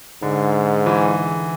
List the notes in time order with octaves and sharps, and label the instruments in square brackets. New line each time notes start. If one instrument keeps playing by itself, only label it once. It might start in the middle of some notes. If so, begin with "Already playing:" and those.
[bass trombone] G#2 [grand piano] D3
[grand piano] E3